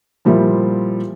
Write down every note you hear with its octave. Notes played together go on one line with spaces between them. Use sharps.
A#2 F3 G3 E4